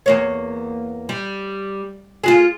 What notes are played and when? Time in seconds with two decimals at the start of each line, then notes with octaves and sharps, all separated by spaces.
0.06 E2 A#3 C#5
1.09 G3
2.24 F4 F#4 G#4